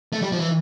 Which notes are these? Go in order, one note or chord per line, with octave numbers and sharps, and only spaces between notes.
A3
G3
F3
E3